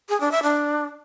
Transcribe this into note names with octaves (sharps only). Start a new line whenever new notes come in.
G#4
D4
E5
D4